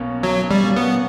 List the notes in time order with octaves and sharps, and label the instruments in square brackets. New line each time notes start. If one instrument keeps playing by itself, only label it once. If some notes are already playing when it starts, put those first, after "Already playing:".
Already playing: [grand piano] B1 B2 A#3 C#4
[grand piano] B1 [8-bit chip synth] F#3
[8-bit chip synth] G3
[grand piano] B2 A#3 C#4
[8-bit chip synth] B3